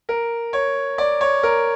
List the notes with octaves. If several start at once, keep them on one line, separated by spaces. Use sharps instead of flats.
A#4
C#5
D5
C#5
A#4